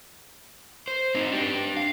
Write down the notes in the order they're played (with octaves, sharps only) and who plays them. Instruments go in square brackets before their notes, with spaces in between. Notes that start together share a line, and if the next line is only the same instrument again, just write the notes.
[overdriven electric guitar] C5
C4 D#4
D4 G4
F5